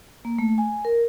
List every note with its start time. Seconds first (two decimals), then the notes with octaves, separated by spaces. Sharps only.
0.25 A#3
0.39 A3
0.58 G#5
0.85 A#4